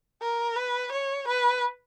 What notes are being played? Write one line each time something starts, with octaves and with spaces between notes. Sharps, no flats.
A#4
B4
C#5
B4